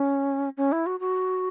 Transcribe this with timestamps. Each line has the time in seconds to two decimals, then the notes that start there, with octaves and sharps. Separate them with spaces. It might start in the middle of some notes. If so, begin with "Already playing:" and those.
Already playing: C#4
0.57 C#4
0.72 E4
0.86 F#4
1.00 F#4